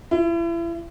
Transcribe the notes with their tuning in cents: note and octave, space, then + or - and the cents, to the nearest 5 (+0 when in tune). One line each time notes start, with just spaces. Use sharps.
E4 +35